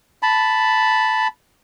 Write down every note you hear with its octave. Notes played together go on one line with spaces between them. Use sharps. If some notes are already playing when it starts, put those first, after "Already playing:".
A5 B5